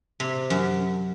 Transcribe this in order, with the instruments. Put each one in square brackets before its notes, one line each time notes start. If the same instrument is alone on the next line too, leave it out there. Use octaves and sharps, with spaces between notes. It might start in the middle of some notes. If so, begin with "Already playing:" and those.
[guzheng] C3
F#2